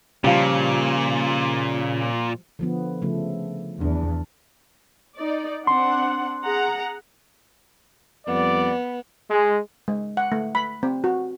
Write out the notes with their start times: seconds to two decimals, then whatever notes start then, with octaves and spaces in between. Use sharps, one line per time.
0.24 A#2 C#3 F3 G3
2.59 D3 F3 B3
3.02 C#3 F3 A3
3.81 E2 D4
5.17 D#4 D5
5.67 C4 D4 F#5 C6
6.43 G#4 F#5 A#5
8.27 F2 G3 B3 D5
9.31 G#3
9.88 G#3
10.17 F#5
10.32 A3
10.55 B5
10.83 C4
11.04 F#4